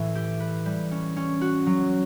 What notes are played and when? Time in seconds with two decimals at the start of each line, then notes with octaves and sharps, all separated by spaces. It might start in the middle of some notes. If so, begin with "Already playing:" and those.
Already playing: A2 E3
0.15 G4
0.40 B4
0.66 G3
0.91 C#4
1.16 C#4
1.41 F#4
1.66 F#3